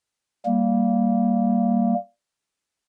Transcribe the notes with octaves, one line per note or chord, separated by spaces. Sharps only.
G3 A#3